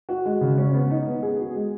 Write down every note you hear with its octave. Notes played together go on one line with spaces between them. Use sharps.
F#4
G#3
C#3
C#4
B3
D#4
B3
G#4
F#4
G#3